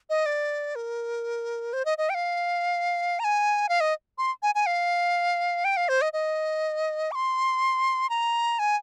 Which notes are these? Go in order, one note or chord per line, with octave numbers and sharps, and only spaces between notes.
D#5
D5
A#4
C5
D#5
D#5
G5
F5
A#5
G#5
F5
D#5
C6
G#5
G#5
F5
G5
F5
C5
D#5
D#5
D6
C6
A#5
G#5